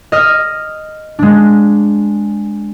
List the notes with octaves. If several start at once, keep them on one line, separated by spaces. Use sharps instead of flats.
D#5 F6
G#3 D4